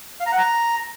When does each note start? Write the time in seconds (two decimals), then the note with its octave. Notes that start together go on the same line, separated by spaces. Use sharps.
0.20 F5
0.26 A#5
0.32 F#5
0.38 A#5